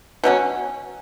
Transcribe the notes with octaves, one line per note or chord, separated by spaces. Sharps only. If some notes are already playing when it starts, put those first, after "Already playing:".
B2 F#3 C#4 F#4